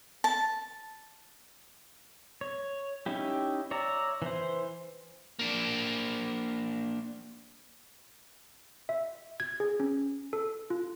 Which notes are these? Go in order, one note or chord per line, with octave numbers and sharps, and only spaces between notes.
A5
C#5
C#4 D#4 E4 G4
C#5 D5 E5 A#5
E3 C5
A#3 D4
E5
G#6
G#4
C#4
A4
F4